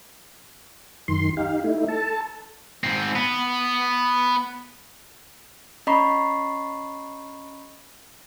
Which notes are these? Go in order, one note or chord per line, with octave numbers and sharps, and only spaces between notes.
F#2 D#3 C6
D#4 G4 F5
A3 D#4 E4
A4 A5
G#2 C4
B3
C#4 D#5 A#5 B5 C#6 C7